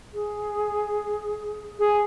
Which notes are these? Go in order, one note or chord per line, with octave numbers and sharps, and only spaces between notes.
G#4
G#4